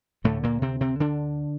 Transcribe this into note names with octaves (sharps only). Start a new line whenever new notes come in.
D2 A2 D3 A3
A#2 A#3
C3 C4
C3 C4
D3 D4